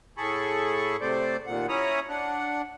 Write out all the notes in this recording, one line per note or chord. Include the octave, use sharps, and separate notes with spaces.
A2 G#4 A4 B5 C#6
C3 A3 C5 D5
D#2 A#2 F#5
C#4 E4 C#5 A#5 B5 D#6
D4 F#5